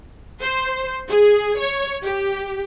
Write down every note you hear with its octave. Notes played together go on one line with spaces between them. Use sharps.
C5
G#4
C#5
G4